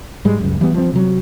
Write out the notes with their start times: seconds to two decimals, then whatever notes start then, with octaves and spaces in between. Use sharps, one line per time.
0.25 G#2 G3 G#3
0.41 C#2 F#2
0.61 E3 G3 B3
0.74 F3 C4
0.93 C3 F#3